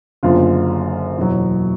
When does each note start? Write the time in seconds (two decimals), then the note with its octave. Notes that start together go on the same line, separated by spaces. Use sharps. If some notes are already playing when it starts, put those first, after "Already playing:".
0.23 F#1 F#2 D3 F4
1.18 E2 B2 F#3